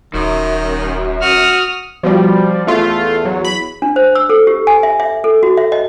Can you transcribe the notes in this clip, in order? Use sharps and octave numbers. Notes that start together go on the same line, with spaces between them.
D#1 F#2 D#3
F#4 D#6 F6
B2 F3 G3
E2 A3 F4
F#3
B5
D4
C5
E6
A4
G4
G#5
E5
E5
A4
F#4
E5
D#5